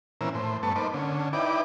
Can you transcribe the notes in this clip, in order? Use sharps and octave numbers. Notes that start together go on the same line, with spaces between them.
A#2 E3 C4 C#4 A#4 E6
A2 C5
G2 A3 B3 A5 C#6
A#3 D#4 B4 C5 D6
D3 C#4
D#4 E4 B4 D5 G5 D6